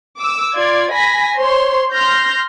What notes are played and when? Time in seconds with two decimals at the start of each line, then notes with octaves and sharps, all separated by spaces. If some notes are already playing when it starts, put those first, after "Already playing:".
0.17 D6 E6
0.55 F4 D5 G#6
0.92 G#5 B5 A#6 B6
1.35 C5 C#5 C6
1.92 C6 F6 G6 A#6